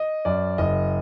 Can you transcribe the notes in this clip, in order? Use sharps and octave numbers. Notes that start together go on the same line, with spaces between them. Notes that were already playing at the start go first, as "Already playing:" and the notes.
Already playing: D#5
F#2 D5
F#1 D#5